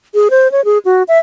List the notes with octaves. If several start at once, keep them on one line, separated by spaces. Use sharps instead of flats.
G#4
C5
C#5
G#4
F#4
E5